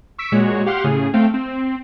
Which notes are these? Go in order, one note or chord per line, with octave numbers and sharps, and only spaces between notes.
C#6 E6 B6 D7
A#2 G#3 F#4 C#5
G4 F5 F#5 C6 F6
A2 C#3 G#4
A3 C4 F5 G5
C4